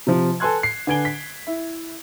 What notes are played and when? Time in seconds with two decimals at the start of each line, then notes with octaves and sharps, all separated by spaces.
0.07 C3 F3
0.40 A4 B4 G#5 C6 F#6 G#6
0.63 C7
0.87 D3 B4 G#5 G#6 D7 G7
1.05 B6
1.47 E4